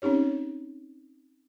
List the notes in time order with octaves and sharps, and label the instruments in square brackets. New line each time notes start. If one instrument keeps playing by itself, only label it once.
[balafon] C4 C#4 D#4 G4 C#5